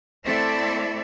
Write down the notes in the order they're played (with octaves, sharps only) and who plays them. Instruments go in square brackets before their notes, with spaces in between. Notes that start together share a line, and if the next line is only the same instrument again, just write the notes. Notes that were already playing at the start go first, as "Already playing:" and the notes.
[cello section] A3 C4 E4 A4 D5 E5